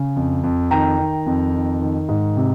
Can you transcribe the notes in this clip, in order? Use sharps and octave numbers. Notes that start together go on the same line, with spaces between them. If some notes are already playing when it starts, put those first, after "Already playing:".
Already playing: C#3
F2
F2
D#3 G5 A#5
D#3
F2
D#3
D#3
G#2
C3